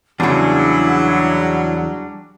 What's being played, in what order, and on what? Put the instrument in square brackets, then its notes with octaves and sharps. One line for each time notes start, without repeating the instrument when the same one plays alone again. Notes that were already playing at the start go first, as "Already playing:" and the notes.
[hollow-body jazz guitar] E2 C#3 [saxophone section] F#3 [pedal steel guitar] G3 D4 G#4 [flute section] E4 F#5